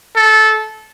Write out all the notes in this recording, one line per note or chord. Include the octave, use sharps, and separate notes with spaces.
A4